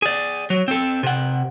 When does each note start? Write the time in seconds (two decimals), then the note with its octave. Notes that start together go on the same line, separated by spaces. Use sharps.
0.02 G#4 D5
0.50 F#3
0.68 C4 A4
1.03 C3 F#5